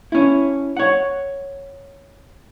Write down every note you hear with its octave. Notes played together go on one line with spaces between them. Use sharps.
C#4 E4
C#5 F#5